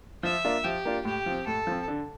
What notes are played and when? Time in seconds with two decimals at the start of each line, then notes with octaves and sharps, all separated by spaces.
0.23 F3 E5
0.44 A#3 D4 F4
0.64 F3 G4
0.85 A#3 D4 F4
1.05 A2 G4
1.26 F3 C4
1.47 A2 A4
1.67 F3 C4
1.88 D3